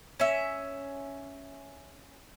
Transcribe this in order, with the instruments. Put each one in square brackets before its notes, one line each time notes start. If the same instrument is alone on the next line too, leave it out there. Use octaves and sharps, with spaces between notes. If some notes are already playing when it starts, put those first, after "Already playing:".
[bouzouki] C#4 E5